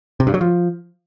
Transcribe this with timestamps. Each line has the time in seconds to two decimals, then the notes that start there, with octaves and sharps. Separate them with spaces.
0.20 C3
0.27 G2
0.34 F#3
0.41 F3